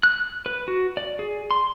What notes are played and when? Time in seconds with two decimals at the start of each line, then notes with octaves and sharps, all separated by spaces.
0.03 F#6
0.46 B4
0.68 F#4
0.97 D5
1.19 G#4
1.51 C6